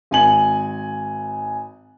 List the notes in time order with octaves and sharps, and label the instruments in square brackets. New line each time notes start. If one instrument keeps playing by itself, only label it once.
[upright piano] G#1 G#5 F#7